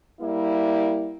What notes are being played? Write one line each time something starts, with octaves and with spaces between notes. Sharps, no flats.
G3 A#3 E4